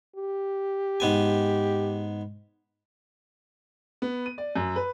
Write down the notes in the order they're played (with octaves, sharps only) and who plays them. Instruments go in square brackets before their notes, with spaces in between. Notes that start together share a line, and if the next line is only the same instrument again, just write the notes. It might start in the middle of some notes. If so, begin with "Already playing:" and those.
[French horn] G4
[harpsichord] G#2 B3 G#5
[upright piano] B3
D#7
D5
F#2
B4